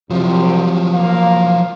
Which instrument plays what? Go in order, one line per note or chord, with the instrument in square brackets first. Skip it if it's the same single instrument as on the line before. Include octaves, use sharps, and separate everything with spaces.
[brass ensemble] C2 C3 [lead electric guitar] F3 F#3
[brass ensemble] A#3 F5